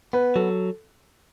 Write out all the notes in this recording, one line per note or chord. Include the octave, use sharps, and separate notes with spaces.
B3 B4
F#3 A4